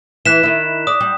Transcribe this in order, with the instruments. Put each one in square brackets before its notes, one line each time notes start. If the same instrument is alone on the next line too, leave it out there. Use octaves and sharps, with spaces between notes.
[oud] E3 [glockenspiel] F#6 B6 E7
[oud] D#3 E4
[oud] D5 [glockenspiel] D#6
[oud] G3